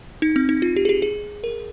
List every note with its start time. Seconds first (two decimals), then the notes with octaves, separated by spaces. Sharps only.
0.22 D#4
0.36 C4
0.49 D#4
0.62 F4
0.76 G4
0.85 G#4
0.89 G4
1.02 G#4
1.44 A#4